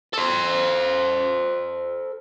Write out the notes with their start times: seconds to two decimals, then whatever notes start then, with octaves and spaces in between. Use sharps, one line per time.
0.13 A4 C5